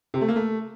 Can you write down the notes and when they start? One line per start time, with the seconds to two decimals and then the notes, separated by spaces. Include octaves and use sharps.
0.14 C3
0.21 A3
0.28 A#3
0.36 A3